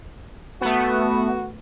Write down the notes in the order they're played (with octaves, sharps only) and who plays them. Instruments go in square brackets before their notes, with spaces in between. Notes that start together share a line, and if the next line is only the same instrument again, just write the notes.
[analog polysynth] A3 B3 [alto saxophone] F#4